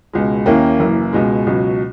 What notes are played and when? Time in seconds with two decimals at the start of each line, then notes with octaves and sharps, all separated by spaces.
0.13 C#2 B2 G#3
0.46 D#2 D#3 A#3 C#4 E4
0.79 F#1 F#2 E3 A#3
1.13 C#2 B2 G#3
1.47 C#2 B2 F#3